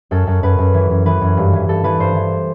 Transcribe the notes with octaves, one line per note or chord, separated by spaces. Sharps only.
F#2 A4
F#2
F#2 B4
F#2
E3
F#2
E3 B4
F#2
G2
E3
G2 A4
E3 B4
G2 C5
E3